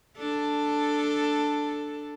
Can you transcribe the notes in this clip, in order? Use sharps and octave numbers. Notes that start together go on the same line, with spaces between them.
D4 A4